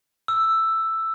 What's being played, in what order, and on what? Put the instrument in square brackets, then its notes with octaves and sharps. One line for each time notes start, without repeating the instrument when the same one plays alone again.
[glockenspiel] E6